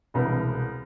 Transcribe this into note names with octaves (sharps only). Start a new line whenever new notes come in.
E1 C2 B4